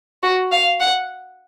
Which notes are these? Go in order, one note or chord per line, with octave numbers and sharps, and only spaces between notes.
F#4
F5
F#5